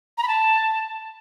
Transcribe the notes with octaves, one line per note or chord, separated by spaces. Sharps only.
A#5
B5
A5